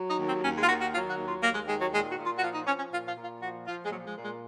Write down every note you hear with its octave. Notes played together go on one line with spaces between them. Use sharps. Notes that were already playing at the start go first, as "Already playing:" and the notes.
Already playing: F#3
D#4
D#2
C4
D#2 C#4
G#3
F4
D#3 F#4
F#4
F#3 F4
F#4
D#2
F4
D#2 A#3
G#3
D#3 G#3
F#3
A#2 G#3
F#4
A#2
F4
F#4
F3 F4
D#4
F3 C#4
C#4
A#2 F4
F4
A#2
F4
F3 F#4
F3 F4
G#3
A#2 F#3
G#3
A#2
G#3